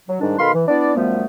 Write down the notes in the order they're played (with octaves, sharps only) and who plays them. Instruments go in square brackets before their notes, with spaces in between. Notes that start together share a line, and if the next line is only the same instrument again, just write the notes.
[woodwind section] F#3
G#2 D#3 G3 D4
B2 D#3 A4 F5 B5 C6
E3
B3 D4 E4 D5
F#2 F3 G3 A3 B3